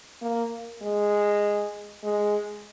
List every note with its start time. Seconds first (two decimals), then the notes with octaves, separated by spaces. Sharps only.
0.22 A#3
0.82 G#3
2.03 G#3